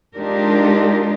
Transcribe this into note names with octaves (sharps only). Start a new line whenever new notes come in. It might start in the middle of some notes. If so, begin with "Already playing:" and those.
G#3 D4 D#4 F4 G4 A#4